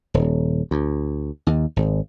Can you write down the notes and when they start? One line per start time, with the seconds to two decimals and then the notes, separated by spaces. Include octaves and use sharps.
0.14 D#1
0.71 D2
1.47 D#2
1.76 G#1